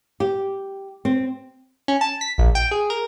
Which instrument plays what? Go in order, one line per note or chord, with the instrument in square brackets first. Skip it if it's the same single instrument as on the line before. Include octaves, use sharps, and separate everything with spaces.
[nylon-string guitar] G4
C4
[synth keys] C#4
A5
B6
A#1
G5
G#4
A#4